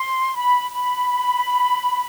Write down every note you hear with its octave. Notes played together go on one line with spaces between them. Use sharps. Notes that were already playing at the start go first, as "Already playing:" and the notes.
Already playing: C6
B5
B5